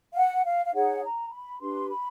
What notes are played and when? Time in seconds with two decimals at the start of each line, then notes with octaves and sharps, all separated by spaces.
0.12 F5
0.16 F#5
0.45 F5
0.66 F5
0.74 D#4 G#4 C#5 F#5
1.03 A#5
1.31 B5
1.61 D4 G4 B4 C6
1.90 B5